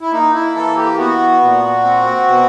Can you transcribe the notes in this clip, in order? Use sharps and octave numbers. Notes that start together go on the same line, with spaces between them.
E4
A#3 D#4
E4
E3 A4
G4
B3 F#4
A#2
C4
B2